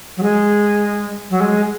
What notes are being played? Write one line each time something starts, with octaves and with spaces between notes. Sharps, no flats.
F#3
G#3
F#3
G#3